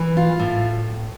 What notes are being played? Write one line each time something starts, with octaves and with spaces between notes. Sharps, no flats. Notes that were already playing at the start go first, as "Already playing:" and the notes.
Already playing: E3
F4
A2